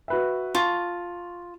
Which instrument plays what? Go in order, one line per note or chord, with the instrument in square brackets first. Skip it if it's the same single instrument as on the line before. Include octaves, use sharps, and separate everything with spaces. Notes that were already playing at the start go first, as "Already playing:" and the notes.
[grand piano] F#4 B4 E5
[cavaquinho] F4 [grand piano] A5 C#6